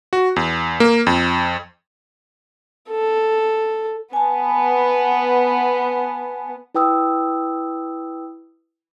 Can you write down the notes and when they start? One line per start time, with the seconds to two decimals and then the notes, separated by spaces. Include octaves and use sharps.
0.13 F#4
0.36 E2
0.80 A#3
1.07 F2
2.90 A4
4.13 B3 G#5 A5
6.75 E4 B4 G5 D#6 E6